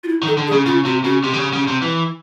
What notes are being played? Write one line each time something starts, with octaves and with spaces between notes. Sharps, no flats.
F4
E4
D#3 A4
D3
G#4
C#3
C#3 F4
C3 F#4
C#3 F#4
C3 G4
D3
C#3
C#3
C3
E3